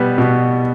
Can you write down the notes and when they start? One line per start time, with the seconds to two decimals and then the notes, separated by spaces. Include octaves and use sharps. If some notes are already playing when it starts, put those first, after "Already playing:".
Already playing: B2 G3 B3
0.18 B2